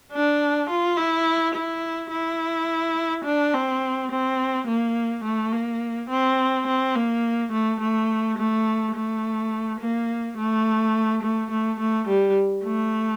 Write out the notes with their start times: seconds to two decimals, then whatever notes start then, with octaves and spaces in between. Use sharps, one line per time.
0.13 D4
0.70 F4
0.97 E4
1.55 E4
2.11 E4
3.25 D4
3.53 C4
4.11 C4
4.67 A#3
5.25 A3
5.53 A#3
6.10 C4
6.67 C4
6.95 A#3
7.52 A3
7.80 A3
8.38 A3
8.95 A3
9.80 A#3
10.38 A3
11.23 A3
11.51 A3
11.80 A3
12.08 G3
12.64 A3